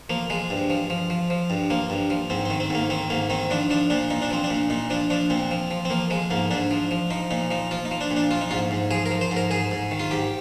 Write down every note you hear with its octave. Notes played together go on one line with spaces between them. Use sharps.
F3 A#3
F3 G#3
G2
F3
F3
F3
F3
G2
F3 A#3
G2
F3
G#2 C4
D#3 C4
C4
G#2 A#3
D#3 C4
G#2 A#3
D#3 C4
F3 D4
F3 D4
A#2 D4
A#2 D#4
D4
F3 C4
D4
A#2
A#2 D#4
F3 D4
F3 D4
A#2 C4
F3
F3
C4
F3 A#3
F3 G#3
G#2 A#3
G#2 D4
F3
F3
F3 D#4
A#2 D#4
F3 D#4
F3 F4
D#4
F3
D4
A#2
D4
F3 F4
D#4
G#2 F4
G#2
F3 G#4
A#4
F3
C5
G#2
A#4
G#2 G#4
G#2
D#3
F4
G#2 G4